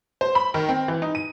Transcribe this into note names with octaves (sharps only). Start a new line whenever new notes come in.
C5
B5
D#3
C4
E3
D#4
D#7